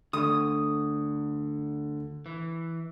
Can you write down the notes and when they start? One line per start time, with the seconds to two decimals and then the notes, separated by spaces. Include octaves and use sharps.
0.13 D2 D3 D#6
2.26 E3